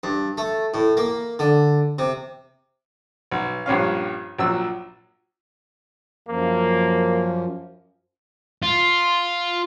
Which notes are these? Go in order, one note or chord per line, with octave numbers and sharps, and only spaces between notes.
G2
A3
A2
A#3
D3
C3
B1
A#1 G2 C#4 F5
A#1 F#3 E6
F#2 F3 A#3
F4